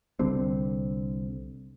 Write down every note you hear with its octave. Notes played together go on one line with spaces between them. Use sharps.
C2 D3 G3 C4